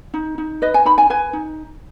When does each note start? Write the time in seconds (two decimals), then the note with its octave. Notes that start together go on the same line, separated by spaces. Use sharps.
0.14 D#4
0.38 D#4
0.62 B4 D#5
0.74 G#5
0.85 D#4 B5
0.98 G#5
1.10 B4 G#5
1.33 D#4